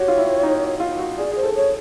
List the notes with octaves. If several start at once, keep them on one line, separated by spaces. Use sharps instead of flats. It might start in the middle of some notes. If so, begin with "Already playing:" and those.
Already playing: F#4 G4 C#5
F4
E4
D#4
F4
F#4
G#4 D5
G#4 C5
A4
C#5